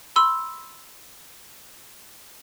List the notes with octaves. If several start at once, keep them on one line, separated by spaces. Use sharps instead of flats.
B5 C6 E6